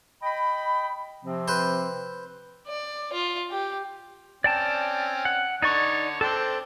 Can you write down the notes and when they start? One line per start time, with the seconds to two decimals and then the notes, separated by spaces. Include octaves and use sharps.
0.22 D#5 G5 B5
1.23 C3 F3 C4
1.48 B4 C5
2.67 D5
3.12 F4
3.51 G4
4.44 C4 C#4 D5 G5 A5
5.25 F#5
5.62 D3 D#4 C#5 D5 C#6
6.21 C4 D4 A4 C5 A5